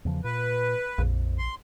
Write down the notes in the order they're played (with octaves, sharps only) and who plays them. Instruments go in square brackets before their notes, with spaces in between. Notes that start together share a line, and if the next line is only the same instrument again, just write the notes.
[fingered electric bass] E2 C#3 F3
[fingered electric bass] A#2 [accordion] B4
[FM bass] A#1 [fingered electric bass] F2
[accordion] C6